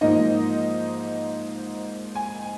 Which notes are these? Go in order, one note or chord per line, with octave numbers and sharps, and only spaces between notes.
G#2 F3 A#3 D#4 D#5
G#5